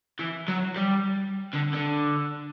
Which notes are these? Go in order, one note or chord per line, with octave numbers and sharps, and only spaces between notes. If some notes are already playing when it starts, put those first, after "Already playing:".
E3
F#3
G3
D3
D3